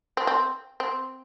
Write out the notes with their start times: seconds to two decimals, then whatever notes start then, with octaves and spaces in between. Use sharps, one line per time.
0.17 C4
0.27 C4
0.80 C4